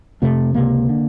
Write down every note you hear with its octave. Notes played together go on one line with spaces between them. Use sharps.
F1 F2 C3 A3
C#2 C3 A#3
D3